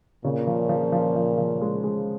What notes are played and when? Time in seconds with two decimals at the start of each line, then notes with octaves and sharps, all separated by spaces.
0.24 A#2 C#3
0.47 F3
0.69 F3
0.92 F3
1.16 F3
1.38 F3
1.61 G#3
1.84 G#3